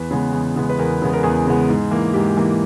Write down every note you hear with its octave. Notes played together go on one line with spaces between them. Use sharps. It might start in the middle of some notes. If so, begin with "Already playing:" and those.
Already playing: E2 B4
C#3 G#3 B3
E2
C#3 G#3 B3
B4
E2 A#4
C#3 G#3 B3
A#4
E2 G#4
C#3 G#3 B3
G#2
E3 A#3
G#2 G4
E3 A#3